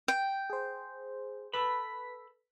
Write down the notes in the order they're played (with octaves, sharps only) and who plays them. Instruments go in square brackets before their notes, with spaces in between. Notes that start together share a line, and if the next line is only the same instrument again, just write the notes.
[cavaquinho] G5
[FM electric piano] G#4 C5
[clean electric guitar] A4 B5 [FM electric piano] B4 B6